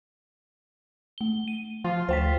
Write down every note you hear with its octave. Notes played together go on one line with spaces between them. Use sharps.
A3 G7
D#7
F3 F4
D2 C5 G5 B6